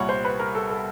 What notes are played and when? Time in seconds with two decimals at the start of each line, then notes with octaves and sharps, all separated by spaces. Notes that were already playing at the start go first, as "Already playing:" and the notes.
Already playing: C2 A#2 G3 C#5 F#5
0.09 C5
0.25 B4
0.39 A#4
0.55 A4
0.70 A4